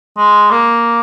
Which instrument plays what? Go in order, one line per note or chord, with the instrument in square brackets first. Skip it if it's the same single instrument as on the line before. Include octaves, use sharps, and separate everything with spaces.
[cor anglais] G#3
A#3